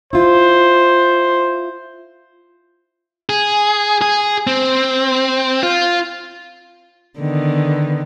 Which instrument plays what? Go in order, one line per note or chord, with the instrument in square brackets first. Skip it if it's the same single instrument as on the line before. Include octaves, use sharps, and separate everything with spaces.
[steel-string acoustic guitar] E4 F4 [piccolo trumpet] C5
[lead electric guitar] G#4
G#4
C4
F4
[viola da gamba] D3 D#3 B3